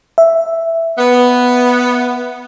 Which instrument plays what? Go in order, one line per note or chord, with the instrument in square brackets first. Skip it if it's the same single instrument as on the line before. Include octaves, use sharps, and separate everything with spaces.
[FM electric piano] E5
[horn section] B3